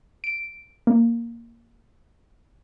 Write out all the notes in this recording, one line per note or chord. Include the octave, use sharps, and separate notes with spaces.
D7
A#3